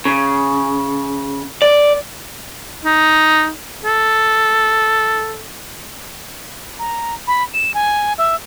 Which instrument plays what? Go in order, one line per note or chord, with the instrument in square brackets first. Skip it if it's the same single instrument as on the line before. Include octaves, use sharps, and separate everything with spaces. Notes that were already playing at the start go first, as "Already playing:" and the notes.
[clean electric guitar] C#3
D5
[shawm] D#4
A4
[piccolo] A#5
B5
E7
G#5
E5